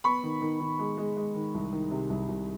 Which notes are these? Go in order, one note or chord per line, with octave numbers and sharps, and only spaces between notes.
B3 B5 C#6
D#3
D#3
D#3
G#3
G#3
G#3
D#3
C2
D#3
C3
C2
C2